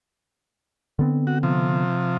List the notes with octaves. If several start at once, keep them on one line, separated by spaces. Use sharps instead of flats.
D3 B3 C4
F#4
C3 F3